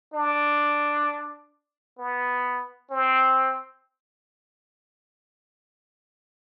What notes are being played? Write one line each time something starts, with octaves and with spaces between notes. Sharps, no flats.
D4
B3
C4